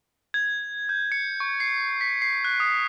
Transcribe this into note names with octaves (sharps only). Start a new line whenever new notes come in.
G#6
G6
C#7
C#6
C7
B6
C7
F#6
D#6